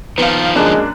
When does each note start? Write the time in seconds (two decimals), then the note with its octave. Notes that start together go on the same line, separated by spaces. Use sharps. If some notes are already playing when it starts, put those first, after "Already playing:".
0.18 D#3 F3 B3 F5
0.56 F#2 G#3 A#3 D4 F#6